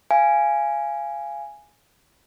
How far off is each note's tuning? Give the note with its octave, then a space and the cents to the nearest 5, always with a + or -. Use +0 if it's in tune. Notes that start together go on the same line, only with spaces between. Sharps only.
F5 -25 G#5 +0